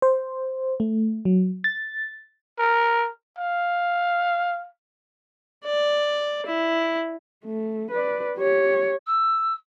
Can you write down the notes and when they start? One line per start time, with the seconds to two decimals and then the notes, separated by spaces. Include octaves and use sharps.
0.02 C5
0.80 A3
1.25 F#3
1.64 A6
2.59 A#4
3.38 F5
5.66 D5
6.47 E4
7.45 A3
7.91 B4 D5
8.37 G4 C#5
9.07 E6